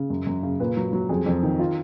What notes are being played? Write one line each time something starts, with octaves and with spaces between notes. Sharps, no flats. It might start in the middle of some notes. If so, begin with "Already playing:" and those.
Already playing: C#3
F#2
F#2
C#3
A#2 B4
F#3
F#3
F2 G#4
F2
D#3
F4